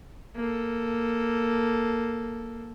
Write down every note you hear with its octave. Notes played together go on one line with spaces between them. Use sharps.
A#3 A4